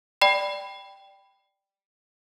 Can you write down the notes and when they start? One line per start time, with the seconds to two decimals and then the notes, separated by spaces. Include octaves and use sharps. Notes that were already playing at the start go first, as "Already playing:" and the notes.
0.22 D5 G5 B5